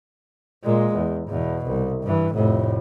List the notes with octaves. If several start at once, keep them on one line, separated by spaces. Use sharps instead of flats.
A#2 G#3
E2
E2 B2
C2
G2 E3
F1 A2